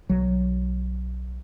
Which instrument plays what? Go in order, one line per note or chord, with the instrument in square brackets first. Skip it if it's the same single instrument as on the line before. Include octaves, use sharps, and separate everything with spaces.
[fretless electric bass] B1 F#3